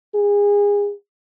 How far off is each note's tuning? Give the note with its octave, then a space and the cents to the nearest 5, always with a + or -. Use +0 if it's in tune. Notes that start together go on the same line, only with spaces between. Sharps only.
G#4 -30